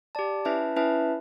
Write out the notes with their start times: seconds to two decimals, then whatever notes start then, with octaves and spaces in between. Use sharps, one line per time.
0.15 G4 D5 A5
0.45 C#4 E4 B4 E5 A5
0.76 C#4 E4 B4 E5 A5